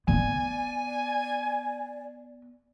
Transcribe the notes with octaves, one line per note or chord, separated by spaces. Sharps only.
B3 D5 G#5